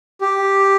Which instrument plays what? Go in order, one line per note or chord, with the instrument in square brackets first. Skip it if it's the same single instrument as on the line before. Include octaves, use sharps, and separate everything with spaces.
[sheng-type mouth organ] G4